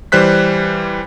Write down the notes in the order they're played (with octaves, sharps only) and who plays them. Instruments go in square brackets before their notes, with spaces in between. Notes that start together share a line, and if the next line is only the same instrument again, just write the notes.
[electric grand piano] E3 G3 C5 F#6 B6